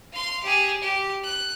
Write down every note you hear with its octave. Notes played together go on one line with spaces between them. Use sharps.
F5 C6
G4 G#4
G4
F#6